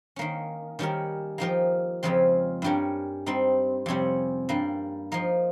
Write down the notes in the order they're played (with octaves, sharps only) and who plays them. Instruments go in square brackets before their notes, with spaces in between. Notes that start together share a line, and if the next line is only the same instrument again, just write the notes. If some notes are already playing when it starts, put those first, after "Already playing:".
[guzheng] D#3 A#3 C#4
D#3 G3 C#4 G4 A#4
F3 A#3 D#4 G4 A#4
F2 C#3 F3 G#3 C4
G2 G3 C#4 G4 A#4
G3 C4 D#4
F2 C3 G3 C#4
G2 G3 A#3
F3 A#3 D#4